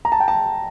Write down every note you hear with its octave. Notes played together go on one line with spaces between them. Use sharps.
A#5
A5
G5
A5